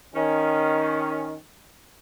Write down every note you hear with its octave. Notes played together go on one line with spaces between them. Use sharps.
D#3 C#4